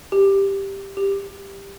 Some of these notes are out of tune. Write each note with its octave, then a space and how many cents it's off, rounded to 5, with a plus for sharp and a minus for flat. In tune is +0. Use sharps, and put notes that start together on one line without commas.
G4 +5
G4 +15